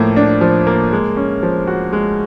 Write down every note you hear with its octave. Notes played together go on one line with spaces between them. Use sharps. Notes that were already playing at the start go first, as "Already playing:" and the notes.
Already playing: A2 F3 A#3
D4
F3
A#3
G#3
C#4
F3
F#4
G#3